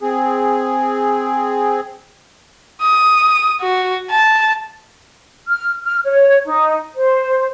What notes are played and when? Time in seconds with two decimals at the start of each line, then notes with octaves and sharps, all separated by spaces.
0.02 C4 G#4
2.82 D#6
3.62 F#4
4.10 A5
5.48 F6
5.84 F6
6.04 C#5
6.46 D#4
6.95 C5